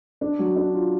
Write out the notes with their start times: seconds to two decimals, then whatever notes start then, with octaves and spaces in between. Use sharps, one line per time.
0.21 D4
0.39 F#3
0.56 D4
0.74 F4